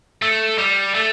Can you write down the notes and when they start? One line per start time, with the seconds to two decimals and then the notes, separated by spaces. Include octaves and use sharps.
0.22 A3
0.58 G3
0.95 A3